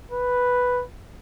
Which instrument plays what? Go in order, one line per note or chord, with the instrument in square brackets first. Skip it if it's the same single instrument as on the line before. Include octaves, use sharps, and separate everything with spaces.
[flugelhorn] B4